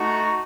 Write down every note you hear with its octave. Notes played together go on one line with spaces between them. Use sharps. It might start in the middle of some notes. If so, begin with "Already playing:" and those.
Already playing: A3 D#4 F#4